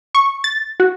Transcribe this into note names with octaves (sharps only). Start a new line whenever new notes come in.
C#6
A6
F#4